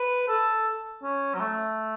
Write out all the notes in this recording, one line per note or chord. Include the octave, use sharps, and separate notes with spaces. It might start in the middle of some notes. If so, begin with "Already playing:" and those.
Already playing: B4
A4
C#4
F#3
A3